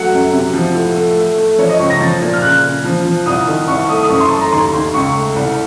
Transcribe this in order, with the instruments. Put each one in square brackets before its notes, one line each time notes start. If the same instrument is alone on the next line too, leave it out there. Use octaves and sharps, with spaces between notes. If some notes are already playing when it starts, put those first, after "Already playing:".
Already playing: [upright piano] F#3 A3 F#5
F#2
C3
F3
A2
A3
A3
A3
F3 C#5
D#5
C#2 C#6
A#6
F3 A6
A#2
F6
C#3 F#6
C#3
F3
F3
C2 D#6
D#3
C2 C#6
A3 D#6
D#6
F#2 C#6
C6
A3 A5
A#5
D#2 C6
D#2
C#2 C#6
A3
C2